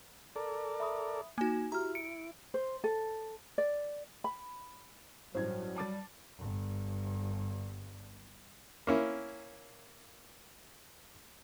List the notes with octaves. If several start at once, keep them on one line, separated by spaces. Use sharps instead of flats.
A4 A#4 D5
E5 B5 D#6
A#3 D#4 F#4 G#5
E4 F#4 G4 A#5 F6
C#7 D7
C5
A4
D5
B5
A1 G2 F#3 C5 A#5 G#6
G3 A5 D6 A6
G1 G2
A#3 C#4 E4